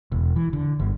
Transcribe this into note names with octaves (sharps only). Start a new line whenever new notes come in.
E1
E3
D3
G1